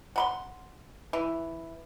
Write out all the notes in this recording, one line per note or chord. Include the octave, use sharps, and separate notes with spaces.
F#5 B5 C6
E3